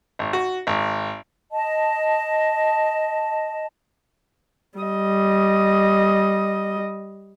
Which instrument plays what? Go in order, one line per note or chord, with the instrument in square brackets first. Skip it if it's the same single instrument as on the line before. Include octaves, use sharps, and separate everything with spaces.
[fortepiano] G#1
F#4
G#1
[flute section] D#5 A5
[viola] G3 D#5